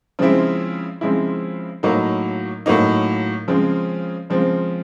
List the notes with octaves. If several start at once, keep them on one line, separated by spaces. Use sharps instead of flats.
C#3 F3 G#3 C4 E4
C#3 F3 G#3 C4 E4
A2 F#3 A#3 D#4
A2 F#3 A#3 D#4
C#3 F3 G#3 C4
C#3 F3 G#3 C4